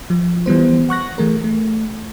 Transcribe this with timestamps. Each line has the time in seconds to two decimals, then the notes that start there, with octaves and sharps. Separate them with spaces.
0.10 F3
0.46 E3 G3 B3 C5
0.89 F#5 C#6 F#6 A#6
1.18 E3 A3 G#4 A#4
1.44 A3